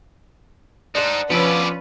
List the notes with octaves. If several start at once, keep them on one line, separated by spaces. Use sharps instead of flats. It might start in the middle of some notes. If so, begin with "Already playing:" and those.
D4 D#4 C5 F#5
F3 B3 C#4 F4 B4 D5 E6